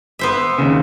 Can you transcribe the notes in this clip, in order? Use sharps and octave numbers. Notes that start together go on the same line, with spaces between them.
B3 C5 E5
D#2 C#3